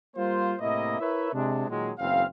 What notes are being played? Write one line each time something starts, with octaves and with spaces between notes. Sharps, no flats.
G3 A#3 F4 C5
A2 C3 A#3 E4 D#5
E4 A#4 B4 C#5 E5
C3 G#3 D4
A#2 D#3 F#3 G#3
F#1 E2 C4 F5